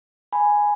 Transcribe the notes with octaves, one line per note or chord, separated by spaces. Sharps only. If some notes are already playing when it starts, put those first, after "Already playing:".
G#5 B5